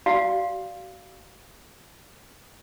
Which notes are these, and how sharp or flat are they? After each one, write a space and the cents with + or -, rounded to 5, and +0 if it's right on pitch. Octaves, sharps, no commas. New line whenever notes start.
F#4 +30 D5 +0 F5 +0